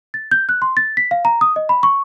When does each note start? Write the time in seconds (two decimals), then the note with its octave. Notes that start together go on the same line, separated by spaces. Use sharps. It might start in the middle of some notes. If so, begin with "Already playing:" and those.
0.14 A6
0.31 G6
0.49 F#6
0.62 C6
0.77 A6
0.97 B6
1.11 F5
1.25 A#5
1.41 D#6
1.56 D#5
1.69 B5
1.83 C#6